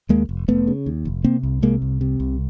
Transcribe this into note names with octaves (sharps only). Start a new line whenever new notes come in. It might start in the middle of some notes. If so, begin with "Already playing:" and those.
D#2 G#3 A#3
F1
F1 A3 B3
C#3
D#2
F1
C3 A#3 C4
C2
C3 G#3 A#3
C2
C3
C2